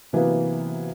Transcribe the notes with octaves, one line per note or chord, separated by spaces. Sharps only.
C3 E3 F#3 A#3 B3